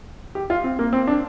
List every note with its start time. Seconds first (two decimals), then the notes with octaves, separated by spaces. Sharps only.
0.35 G4
0.50 F4
0.64 C4
0.79 A#3
0.93 C4
1.07 D4